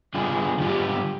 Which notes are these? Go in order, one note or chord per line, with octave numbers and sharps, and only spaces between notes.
D3 G3 B3 D4 F4 G#4
D3 G3 B3 D4 F4 G4